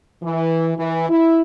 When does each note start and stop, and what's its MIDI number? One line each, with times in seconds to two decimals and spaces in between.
0.23 0.72 52
0.77 1.05 52
1.09 1.41 64